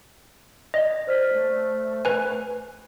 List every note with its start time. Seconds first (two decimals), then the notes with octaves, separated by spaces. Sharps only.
0.74 D5 D#5
1.07 C5 D5 F6 B6
1.33 A3
2.05 B4 G#5